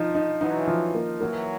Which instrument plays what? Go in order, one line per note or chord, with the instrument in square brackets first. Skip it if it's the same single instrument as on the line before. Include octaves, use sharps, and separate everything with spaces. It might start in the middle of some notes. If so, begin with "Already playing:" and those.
Already playing: [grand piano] F3 D#4
D#4
[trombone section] E3 F#3 [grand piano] D#4
[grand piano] F3
A#3
[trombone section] E3 F#3 [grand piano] A#3